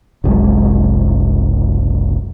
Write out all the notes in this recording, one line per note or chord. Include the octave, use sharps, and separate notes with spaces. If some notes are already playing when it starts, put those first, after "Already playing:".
F#1 C2 F#2 G#3